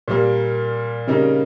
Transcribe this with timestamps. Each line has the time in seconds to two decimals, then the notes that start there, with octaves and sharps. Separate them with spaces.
0.08 A#2 G3 A#3
1.07 C#3 G3 A#3 D#4